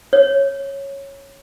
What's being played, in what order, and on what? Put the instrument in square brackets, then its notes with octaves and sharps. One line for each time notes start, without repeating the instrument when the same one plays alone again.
[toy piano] C#5